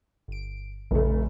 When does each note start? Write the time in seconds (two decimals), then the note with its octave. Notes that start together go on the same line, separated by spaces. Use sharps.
0.28 G1 D7
0.91 F1 A#1 C#3 A3